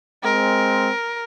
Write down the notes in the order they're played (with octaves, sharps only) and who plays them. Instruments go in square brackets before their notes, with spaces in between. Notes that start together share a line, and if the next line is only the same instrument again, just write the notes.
[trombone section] G#3 C4 [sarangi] A#4